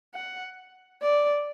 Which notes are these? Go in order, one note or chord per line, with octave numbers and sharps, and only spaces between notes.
F#5
D5